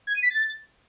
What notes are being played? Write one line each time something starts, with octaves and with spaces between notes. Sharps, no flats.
G#6
D#7
B6
A6